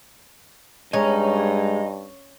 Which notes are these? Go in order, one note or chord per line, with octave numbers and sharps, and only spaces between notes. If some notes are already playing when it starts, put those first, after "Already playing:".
G2 G#3 C#4 D#5 A#5